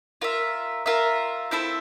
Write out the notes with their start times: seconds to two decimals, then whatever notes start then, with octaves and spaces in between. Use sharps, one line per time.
0.21 F4 A#4 E5
0.86 F4 A#4 E5
1.51 C4 E4 A4 C5